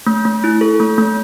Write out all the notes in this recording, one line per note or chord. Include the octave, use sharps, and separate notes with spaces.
A3
A3
E4
A4
A3
A3